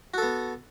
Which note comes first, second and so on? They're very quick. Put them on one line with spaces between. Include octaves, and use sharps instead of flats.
F#4 A4 B3